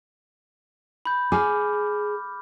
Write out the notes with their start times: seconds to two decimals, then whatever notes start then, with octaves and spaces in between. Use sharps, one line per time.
1.05 B5 G6
1.32 G#4 D6 F6